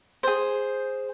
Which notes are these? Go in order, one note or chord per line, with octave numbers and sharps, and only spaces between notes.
G#4 C5